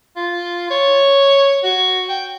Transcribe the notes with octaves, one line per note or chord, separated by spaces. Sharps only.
F4
C#5
F#4
G5